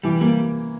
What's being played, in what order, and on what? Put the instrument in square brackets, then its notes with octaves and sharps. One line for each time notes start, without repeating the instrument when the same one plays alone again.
[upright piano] E3 [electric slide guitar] G3
[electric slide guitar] G3 [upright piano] A#3